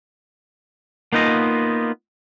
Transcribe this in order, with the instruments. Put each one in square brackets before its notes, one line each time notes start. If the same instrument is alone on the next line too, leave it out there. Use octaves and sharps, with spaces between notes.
[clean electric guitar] A#3 B3 D#4 F4 D#5